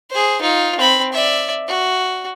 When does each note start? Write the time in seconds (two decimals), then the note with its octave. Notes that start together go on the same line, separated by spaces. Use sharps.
0.10 G#4 C5
0.41 D#4 F4
0.79 C4 B5
1.13 D5 E5
1.68 F#4